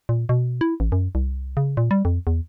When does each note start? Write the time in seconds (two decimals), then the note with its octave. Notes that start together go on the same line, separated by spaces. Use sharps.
0.09 A#2
0.29 B2
0.61 E4
0.80 A1
0.92 F#2
1.15 C2
1.57 C#3
1.77 A#2
1.91 G3
2.05 F2
2.27 E2